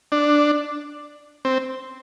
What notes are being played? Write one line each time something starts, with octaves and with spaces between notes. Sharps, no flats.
D4
C4